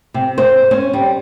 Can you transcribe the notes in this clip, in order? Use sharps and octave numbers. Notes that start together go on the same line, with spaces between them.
C3
C5
C#4
G3